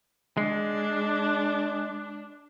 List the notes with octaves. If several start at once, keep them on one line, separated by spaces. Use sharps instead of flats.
G#3 D4